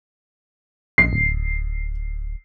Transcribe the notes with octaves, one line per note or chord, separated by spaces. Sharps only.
A#1 C7
D1